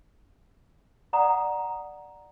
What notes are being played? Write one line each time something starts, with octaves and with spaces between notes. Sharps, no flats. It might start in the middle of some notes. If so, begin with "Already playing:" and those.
D5 F#5 A#5 D#6